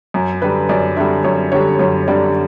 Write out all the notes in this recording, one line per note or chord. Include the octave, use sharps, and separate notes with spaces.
F#2
D3 G3 B4
F#2 D5
D3 G3 E5
F#2 C#5
D3 G3 C#5
F#2 C#5
D3 G3 D5